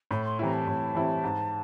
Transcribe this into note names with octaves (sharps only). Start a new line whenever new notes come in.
A2 B5
C6
E3 G3 C4 E4 A#5
A5
A2
E3 G3 C4 E4
G#2